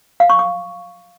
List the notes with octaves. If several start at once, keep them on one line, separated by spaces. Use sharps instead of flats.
F5
C#6
D6